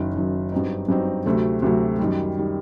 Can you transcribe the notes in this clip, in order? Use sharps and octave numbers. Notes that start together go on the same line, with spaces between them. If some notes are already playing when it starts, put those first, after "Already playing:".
Already playing: F#1 F#2 D#3
F#1 F#2 D#3
G2 F#3 C4 D#4
G2 F#3 C4 D#4
D2 C3 F#3 A3
D2 C3 F#3 A3
F#2 D#3 G3
D#3 G3